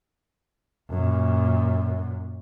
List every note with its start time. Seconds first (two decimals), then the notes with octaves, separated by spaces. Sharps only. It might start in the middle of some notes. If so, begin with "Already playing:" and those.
0.90 F#2 A#2